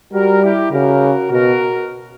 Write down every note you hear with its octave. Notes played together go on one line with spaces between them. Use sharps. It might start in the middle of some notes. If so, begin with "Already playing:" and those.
G3 F#4 A#4
E4 G4
C#3 F#4 A#4
B2 F#4 A#4